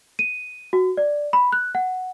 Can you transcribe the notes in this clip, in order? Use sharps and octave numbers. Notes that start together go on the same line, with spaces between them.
D#7
F#4
D5
B5
F#6
F#5